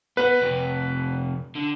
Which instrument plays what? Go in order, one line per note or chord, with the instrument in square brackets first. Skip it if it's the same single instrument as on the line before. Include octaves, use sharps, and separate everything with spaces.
[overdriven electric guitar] B3 [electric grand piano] B4
[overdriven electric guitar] F2 C3
D3